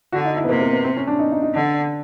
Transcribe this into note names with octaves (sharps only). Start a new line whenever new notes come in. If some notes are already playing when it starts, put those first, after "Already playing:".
D3 F#4
D#4
E4
B3
C3 A#3
A#3
B3
C4
C#4
D4
D#4
D#4
D#4
D3 D4